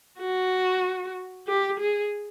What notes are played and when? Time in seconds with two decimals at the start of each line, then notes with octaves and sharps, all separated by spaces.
0.20 F#4
1.48 G4
1.80 G#4